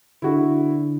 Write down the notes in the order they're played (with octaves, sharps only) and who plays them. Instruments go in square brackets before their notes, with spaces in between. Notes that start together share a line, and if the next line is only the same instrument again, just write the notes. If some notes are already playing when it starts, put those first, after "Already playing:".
[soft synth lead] D3 [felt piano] E4 F#4